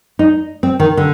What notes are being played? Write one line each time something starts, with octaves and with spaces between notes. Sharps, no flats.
D#4
C4
D#3
D3